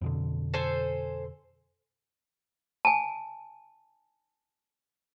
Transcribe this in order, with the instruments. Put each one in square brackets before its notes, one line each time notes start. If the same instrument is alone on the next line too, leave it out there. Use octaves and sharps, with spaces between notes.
[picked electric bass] F2 B2 D3
[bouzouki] A4 C5 G#5
[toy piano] G#5 A5